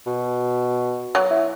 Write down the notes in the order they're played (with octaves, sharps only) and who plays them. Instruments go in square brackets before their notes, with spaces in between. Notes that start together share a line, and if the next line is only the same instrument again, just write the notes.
[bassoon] B2
[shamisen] F#3
[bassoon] E4